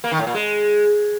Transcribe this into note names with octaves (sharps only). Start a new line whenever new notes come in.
A#3
D#3
A2
A#2
G#3